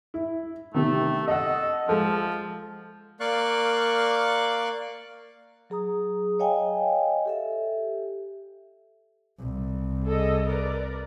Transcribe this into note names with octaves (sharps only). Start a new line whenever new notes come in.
E4
C3 D#3 A3
A4 D#5 F#5
F3 G#3 A4
A#3 D5 F5 C#6 F#6
F#3 G#4 A#5 D#6
C#5 D#5 F5 G5 G#5
G4 A4 E5
C2
G#4 A4 D#5
A#4 B4 D5